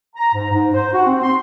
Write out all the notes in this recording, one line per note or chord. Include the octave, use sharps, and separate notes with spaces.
A#5
G#2
G#2
C5
F#4
C4
C6